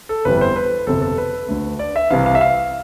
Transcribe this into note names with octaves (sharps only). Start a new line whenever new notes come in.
A4
G1 F2 E3 G3 B3 B4
B4
C5
B4
G1 F2 C3 A4
A4
B4
D2 D3 A3
D5
E5
C2 C3 E3 F5
F5
E5
F5